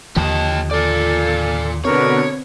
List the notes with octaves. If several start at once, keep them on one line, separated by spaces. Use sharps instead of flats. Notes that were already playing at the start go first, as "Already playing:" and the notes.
D#2 D3 F3 G4 D#5 A5
F4 A4 D5
B2 D3 B3 C4 A#4 C#5